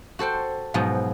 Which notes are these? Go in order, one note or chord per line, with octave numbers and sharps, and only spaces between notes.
F#4 A4 C5 G5
G#2 B2 F3 F#3